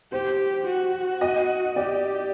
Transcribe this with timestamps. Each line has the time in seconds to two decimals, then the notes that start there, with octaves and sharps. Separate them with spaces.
0.12 G4 C5
0.67 F#4
1.21 D#5
1.76 G4 D5